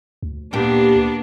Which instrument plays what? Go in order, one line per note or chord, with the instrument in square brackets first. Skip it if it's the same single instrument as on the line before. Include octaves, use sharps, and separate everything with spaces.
[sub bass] D2
[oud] A#2 G4 [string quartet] A#3 B3 D4